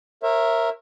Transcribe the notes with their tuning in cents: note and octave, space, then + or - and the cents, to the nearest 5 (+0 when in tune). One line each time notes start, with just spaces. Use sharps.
A#4 +0 C#5 -35 E5 +5